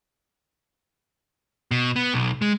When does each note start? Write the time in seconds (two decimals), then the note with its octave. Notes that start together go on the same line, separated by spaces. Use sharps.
1.71 B2
1.96 B3
2.14 B1
2.42 G#3